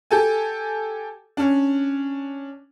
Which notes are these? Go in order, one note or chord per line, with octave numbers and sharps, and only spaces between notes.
G4 A4 G#5
C#4 D4